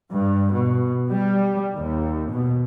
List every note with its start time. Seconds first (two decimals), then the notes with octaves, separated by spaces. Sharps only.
0.11 G2
0.53 B2
1.10 G3
1.75 D#2
2.30 B2